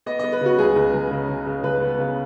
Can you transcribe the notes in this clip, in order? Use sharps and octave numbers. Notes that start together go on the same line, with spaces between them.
B3 D#5
B3 D#5
B4
C#3 F#4
C#2 G#4
C#2
C#2
C#3
C#3
C#3
C#2 B4
B3
C#3